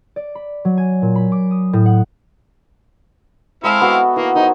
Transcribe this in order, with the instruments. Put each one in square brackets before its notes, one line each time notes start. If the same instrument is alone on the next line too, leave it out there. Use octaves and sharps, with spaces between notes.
[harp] D5
B5
F#3
G#5
A#2
B5
D6
D#6
A2
F#5
[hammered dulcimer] G#3 A4 E5 [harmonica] C4 E4 F5
[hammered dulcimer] B3 F#4 A4
[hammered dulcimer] E3 [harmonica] A#3
[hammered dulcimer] D#3 C5 C#5 [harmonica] D#4